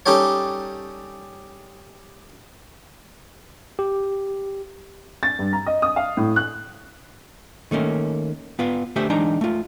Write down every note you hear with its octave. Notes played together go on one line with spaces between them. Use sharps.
G3 C#4 D#4 G4 A4 C#5
G4
A6
G2
A#5
D#5
D#6
F5
A2
F#6
D#3 A3 A#3 C#4
B3 F4 B4 F5
D3 A3 G4 C5 E5
E3 G#3 D4 D#4 A#5
A3 F4